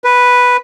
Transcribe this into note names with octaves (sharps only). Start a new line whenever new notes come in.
B4